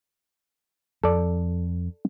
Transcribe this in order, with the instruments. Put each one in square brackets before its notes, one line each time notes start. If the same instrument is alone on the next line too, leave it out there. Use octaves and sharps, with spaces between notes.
[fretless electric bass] F2 [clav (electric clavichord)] A4 D5